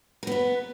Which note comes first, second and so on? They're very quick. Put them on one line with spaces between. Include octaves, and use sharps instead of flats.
A#4 B3 B4